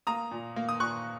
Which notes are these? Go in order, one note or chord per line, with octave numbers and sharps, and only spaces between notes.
A#3 A#5 D#6
A#2
A#3
D#6
A#2 C#6 F#6